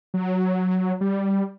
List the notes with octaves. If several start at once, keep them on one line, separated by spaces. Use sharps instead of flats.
F#3
G3